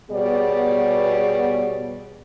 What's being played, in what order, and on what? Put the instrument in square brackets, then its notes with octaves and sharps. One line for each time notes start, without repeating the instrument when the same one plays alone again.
[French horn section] B2 G3 B3 G#4 C#5 D5